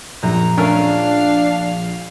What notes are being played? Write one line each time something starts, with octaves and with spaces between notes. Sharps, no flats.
A#1 F#2 A#5
A3 C#4 D4 A#4 F5